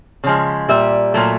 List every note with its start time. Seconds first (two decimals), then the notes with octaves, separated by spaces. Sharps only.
0.24 C#3 F3 G#3
0.69 A#2 G3 E5
1.14 A#2 F#3 A3